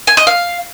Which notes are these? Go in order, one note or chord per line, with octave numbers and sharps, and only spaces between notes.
G#5
D#5
F5